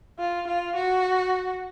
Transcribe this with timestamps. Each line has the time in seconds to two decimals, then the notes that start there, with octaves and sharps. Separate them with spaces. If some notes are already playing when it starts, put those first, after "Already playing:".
0.19 F4
0.47 F4
0.75 F#4